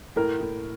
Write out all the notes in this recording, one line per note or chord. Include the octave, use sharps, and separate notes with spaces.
A2 A#4
A2